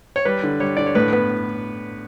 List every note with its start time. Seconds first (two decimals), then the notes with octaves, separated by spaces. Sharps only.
0.16 C#5
0.25 G3 B4
0.43 D3
0.60 G3 C#5
0.77 D3 D5
0.86 C#5
0.95 A2 B4
1.13 B3 B4